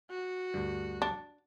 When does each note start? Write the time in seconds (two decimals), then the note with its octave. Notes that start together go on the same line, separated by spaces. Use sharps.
0.11 F#4
0.54 D2 G2
1.02 D4